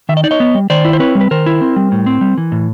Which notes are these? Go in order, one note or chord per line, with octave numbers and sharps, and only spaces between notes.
D#3 E5
D#5
D#4 D5
C#5 D#5
B3
G3
D#3 C5 D5
E4
C5
C4 B4 C#5
G3
B4
D#3 A#4 C5
E4
C4
G3
A2
C4
G3
E3
A2